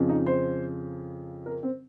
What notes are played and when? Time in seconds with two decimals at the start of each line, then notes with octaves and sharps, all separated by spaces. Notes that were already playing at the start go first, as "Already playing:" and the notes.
Already playing: F2 C#3 F3
0.09 D#4
0.26 C5
1.46 A#4
1.63 C4